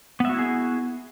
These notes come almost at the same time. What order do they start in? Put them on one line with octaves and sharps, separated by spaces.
B3 E5 F#4 E4 G#4